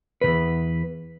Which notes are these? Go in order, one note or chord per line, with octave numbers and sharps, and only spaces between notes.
E2 B2 B4